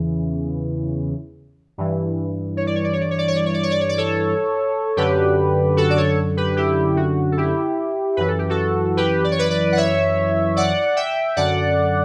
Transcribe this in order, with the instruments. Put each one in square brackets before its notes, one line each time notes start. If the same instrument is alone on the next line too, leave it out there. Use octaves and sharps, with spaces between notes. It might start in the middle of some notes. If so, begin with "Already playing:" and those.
Already playing: [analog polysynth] E2 C#3 E3
G2 E3
C#5
D5
C#5
D5
C#5
D5
C#5
D5
C#5
D5
C#5
D5
C#5
D5
C#5
D5
A4 C#5
F#2 D3 G4 B4
F#4 A4
D5
A4 C#5
G4 B4
E4 G4
F#4
A4
E4 G4
F#2 E3 B4
A4
G4
F#4 A4
G4 B4
D5
C#5
B4 D5
B4 D5
F#5
C#5 E5
D5 F#5
E5 G5
F#2 D3 D5 F#5